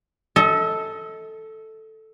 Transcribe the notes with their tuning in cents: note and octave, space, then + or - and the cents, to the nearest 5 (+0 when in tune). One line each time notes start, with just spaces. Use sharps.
A4 +0 D#5 +40